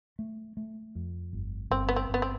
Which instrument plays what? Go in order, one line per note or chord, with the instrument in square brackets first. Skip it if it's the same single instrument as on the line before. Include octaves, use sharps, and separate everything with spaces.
[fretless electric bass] A3
A3
F2
G1
[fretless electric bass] G1 [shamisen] C4
[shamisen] B3
C4
[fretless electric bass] G1 [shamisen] B3
[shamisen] C4